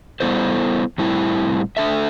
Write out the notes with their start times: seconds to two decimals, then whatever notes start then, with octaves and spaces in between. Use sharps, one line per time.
0.20 G3 B3 E4 A4 C5
0.98 A2 G3 C4 E4
1.77 A3 D4 A4 E5